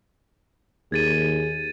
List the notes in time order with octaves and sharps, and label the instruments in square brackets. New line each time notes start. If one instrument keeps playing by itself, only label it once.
[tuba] D#2 [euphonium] G#4 [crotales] G#6 A6 D#7